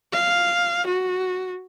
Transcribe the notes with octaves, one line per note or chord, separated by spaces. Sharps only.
F5
F#4